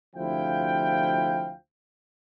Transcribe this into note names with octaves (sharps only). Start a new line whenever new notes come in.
D2 C3 F3 E4 F5 G5